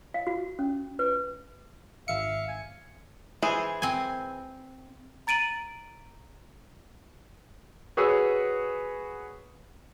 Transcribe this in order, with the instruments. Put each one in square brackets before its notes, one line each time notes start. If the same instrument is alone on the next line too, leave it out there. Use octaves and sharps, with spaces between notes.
[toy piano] F5
F#4
C#4
B4
[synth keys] G#1 C#7 [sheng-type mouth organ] E5 F5
[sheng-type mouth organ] G#5
[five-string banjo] E3 G#4 C5
[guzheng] C4 G#5
[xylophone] A#5 A6 D7 D#7 F#7
[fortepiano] F#4 G#4 B4 C#5 E6